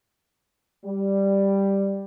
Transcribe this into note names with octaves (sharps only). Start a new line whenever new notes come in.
G3